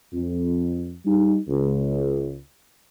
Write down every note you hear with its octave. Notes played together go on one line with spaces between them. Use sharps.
F2
G3 D#4
C#2